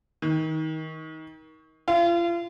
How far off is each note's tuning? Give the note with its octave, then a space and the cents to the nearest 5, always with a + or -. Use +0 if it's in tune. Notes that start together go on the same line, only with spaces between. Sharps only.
D#3 +25
F4 -35